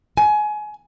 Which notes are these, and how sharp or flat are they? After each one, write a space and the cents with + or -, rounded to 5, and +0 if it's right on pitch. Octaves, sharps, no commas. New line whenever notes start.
G#5 +25